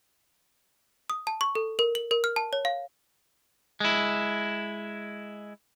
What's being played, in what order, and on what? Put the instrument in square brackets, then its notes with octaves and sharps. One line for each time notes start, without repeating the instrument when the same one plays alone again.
[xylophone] D#6
A5
C#6
A4
A#4
F#7
A#4
F6
A5
C#5
F5
[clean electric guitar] G#3 E4